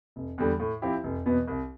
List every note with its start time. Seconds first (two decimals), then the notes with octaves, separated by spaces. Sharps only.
0.16 F1
0.38 E2 D3 G3
0.60 A2
0.82 F3 C4 E4 G4
1.04 F1
1.26 E2 B2 B3
1.47 C2